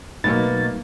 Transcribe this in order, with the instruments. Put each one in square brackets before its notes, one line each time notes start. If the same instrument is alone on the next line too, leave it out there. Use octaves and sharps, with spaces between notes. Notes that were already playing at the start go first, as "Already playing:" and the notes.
[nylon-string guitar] B2 [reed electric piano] F#3 D#4 [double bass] A3 A#3 [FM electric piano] A6